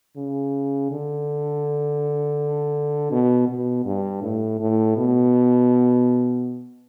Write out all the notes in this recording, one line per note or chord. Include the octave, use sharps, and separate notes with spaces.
C#3
D3
B2
B2
G2
A2
A2
B2